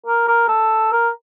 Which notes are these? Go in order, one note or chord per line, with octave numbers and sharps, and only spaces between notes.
A#4
A#4
A4
A#4